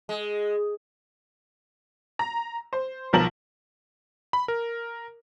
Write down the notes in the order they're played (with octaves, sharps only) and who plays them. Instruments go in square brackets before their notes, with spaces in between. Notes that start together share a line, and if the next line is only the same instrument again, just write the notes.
[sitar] G#3
[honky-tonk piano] A#5
C5
B1 F3 A#4 A5 F#7
[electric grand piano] B5
A#4